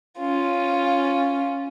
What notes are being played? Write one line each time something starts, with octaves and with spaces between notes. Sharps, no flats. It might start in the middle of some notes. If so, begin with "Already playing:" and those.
C#4 F4